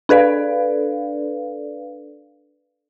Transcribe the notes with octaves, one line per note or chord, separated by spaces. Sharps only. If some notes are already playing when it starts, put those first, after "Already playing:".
D4 A4 B4 D5 F5